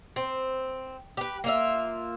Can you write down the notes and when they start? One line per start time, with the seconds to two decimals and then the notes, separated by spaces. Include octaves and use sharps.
0.16 C4
1.17 G4 B4
1.44 A#3 F4 E5